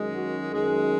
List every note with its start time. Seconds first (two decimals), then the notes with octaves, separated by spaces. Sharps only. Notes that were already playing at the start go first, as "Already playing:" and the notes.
Already playing: F#2 D#3 G#3
0.14 F#4
0.52 F#2 D#3 G#3